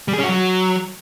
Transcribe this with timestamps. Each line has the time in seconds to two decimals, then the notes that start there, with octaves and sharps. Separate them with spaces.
0.08 G3
0.13 G#4
0.18 C#4
0.24 F#4
0.29 F#3